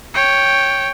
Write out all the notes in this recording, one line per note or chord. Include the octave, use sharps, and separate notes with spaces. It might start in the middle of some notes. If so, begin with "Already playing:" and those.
C#5 G5